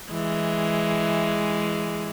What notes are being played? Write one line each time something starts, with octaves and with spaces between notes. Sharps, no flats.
E3 G#3